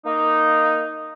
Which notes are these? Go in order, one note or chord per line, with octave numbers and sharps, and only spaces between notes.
A#3 D#4